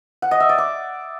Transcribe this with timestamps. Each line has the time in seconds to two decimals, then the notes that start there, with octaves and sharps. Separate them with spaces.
0.22 F#5
0.31 D#5
0.40 E5
0.49 D5
0.58 D6